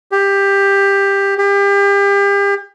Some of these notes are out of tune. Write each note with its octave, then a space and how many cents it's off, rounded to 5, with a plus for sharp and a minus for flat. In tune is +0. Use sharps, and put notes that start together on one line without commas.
G4 +15
G4 +35